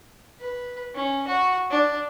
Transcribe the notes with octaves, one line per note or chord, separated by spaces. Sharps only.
B4
C#4
F#4
D4